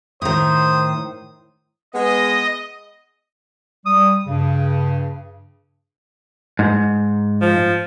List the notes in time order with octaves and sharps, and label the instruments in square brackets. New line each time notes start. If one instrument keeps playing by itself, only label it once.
[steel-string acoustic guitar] A2 D#3 [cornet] C5 [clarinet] D#6
[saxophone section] G#3 B3 [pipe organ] D#5
[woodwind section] G3 D#6
G2 C#3
[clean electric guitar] G#2
[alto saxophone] F3